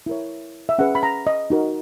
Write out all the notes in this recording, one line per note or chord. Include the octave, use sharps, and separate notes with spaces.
E4 A#4 C#5
E5
C#4 G#4 B4 F#5
B5
A#5
D#5
D#4 F#4 A#4